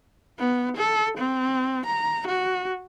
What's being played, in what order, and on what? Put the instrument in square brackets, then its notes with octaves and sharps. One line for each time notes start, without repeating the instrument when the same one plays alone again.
[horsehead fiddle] B3
A4
C4
A#5
F#4